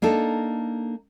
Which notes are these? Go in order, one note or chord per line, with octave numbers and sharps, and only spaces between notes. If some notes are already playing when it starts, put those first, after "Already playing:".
A#3 D4 D#4 A4